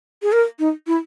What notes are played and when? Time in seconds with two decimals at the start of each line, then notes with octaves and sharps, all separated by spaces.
0.22 G#4
0.32 A#4
0.59 D#4
0.87 E4